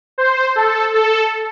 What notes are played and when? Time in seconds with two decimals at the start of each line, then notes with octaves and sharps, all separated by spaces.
0.18 C5
0.56 A4
0.94 A4